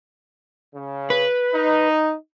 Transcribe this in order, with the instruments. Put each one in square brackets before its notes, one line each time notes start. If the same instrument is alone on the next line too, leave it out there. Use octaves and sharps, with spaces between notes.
[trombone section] C#3
[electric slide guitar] B4
[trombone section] D#4